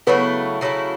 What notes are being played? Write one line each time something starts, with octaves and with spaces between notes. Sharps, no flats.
C#3 F#3 A3 B3 E4
C#3 F#3 A3 E4